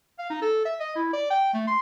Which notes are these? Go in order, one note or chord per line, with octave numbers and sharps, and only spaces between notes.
F5
D#4
A4
E5
D#5
E4
D5
G5
A3
C6